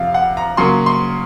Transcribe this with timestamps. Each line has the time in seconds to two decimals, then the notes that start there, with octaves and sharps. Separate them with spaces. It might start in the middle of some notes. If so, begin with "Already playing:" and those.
Already playing: F2 C3 F3 F5
0.14 F#5
0.37 A#5
0.57 C#3 F#3 A#3 C6
0.86 C6